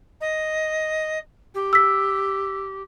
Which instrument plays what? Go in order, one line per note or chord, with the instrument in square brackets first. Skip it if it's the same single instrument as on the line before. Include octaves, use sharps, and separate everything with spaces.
[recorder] D#5
G4
[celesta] E6 B6